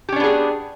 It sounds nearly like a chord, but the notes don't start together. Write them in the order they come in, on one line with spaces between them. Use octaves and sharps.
G4 C#4 D4 B3 G#4